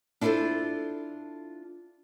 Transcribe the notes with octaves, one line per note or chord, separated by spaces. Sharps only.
D4 E4 F4 G4 A4 C5